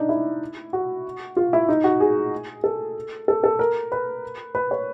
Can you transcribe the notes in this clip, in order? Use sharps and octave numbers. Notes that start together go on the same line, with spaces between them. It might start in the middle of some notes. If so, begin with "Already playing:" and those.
Already playing: D4 D#4
E4
F#4
F4
E4
D#4
F#4
G#4
A4
A4
A4
A#4
B4
B4
C#5